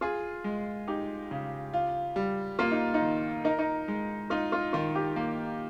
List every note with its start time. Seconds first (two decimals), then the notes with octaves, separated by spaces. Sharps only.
0.01 F4 G#4
0.44 G#3
0.88 D#4 G4
1.31 C#3
1.74 F4
2.16 G3
2.59 A#3 F4
2.71 D#4
2.94 D#4
3.02 D#3
3.44 D#4 A#4
3.59 D#4
3.88 G#3
4.30 D#4 F4
4.52 F4
4.73 D#3 F4
4.95 G4
5.16 A#3